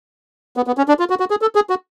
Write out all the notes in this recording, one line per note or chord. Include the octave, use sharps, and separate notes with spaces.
B3
B3
C#4
D4
F4
F#4
F#4
G#4
A4
G#4
F#4